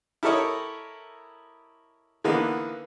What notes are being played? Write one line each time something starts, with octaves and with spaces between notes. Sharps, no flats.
E4 G4 A4 A#4 C#5 D#5
D3 E3 A#3 B3 D#4